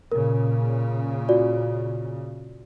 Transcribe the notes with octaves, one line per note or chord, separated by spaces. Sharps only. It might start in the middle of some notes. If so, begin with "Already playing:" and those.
A#2 C#3 A#4
F4 F#4 D5